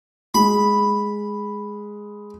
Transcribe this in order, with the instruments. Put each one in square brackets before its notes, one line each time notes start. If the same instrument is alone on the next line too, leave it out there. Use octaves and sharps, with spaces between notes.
[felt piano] G#3 [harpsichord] B5